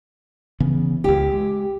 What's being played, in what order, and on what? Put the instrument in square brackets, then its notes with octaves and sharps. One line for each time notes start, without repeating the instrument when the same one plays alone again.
[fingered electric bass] C#3 E3 B3
[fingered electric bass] E1 C#2 [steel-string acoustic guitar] G4
[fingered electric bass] G#3